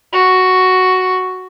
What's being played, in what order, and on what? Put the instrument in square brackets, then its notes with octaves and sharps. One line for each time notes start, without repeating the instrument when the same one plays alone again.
[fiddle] F#4